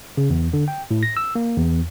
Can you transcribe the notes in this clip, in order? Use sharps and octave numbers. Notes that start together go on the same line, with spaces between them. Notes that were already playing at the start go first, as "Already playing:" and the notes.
C#3
E2
D3
G5
A2
A#6
E6
A#3
E2